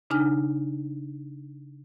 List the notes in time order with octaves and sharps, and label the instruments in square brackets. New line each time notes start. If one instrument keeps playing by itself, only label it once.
[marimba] C#3 D4 D#4 G#5 F6